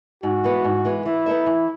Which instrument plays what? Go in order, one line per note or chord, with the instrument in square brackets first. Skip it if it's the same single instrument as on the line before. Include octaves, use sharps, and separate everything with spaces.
[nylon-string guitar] G#2 [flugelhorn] F#4
[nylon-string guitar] E3 G#3 B3
G#2
E3 G#3 B3
[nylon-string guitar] E3 [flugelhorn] E4
[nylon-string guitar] B3 D#4 A4 E5
E3